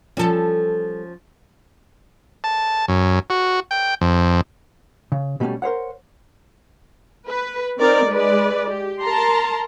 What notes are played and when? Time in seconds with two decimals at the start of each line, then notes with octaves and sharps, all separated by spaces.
0.17 F3 G3 C#4 A4
2.44 A5
2.88 F#2
3.30 F#4
3.71 G5
4.01 F2
5.12 C#3
5.40 B2 G3 A3 A#3 C#4
5.62 A#4 C5 C#5 F#5
7.27 B4
7.79 C4 D#4 A#4 D5
8.09 G#3 B4 D5
8.67 G4
9.01 A#4 A5 A#5 C6